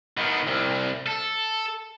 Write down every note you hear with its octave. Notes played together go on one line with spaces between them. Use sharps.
D#3 B3
C2
A4